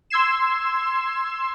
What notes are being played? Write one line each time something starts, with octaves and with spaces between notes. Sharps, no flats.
C6 E6 G#6 C7 E7